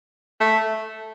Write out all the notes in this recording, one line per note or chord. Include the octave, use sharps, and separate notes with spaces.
A3